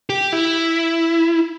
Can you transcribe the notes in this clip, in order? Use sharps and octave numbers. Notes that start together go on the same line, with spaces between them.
G4
E4